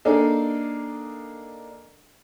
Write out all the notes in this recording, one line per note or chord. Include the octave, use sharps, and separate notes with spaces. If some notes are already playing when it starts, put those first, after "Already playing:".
A#3 D4 D#4 G#4 A4